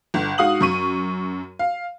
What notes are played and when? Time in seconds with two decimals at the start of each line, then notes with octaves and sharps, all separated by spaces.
0.14 G1
0.38 G#2 F#4 F5 D#6 F#7
0.61 F#2 C#6 D#7
1.59 F5